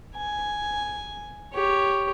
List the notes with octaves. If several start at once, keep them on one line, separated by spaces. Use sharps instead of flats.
G#5
G4 C#5